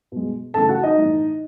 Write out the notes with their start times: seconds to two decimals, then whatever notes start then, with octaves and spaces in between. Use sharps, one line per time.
0.12 B2 G#3
0.54 C#3 E3 A3 A4 A5
0.69 F#4 F#5
0.83 D#4 D#5
0.98 A2 E3 A3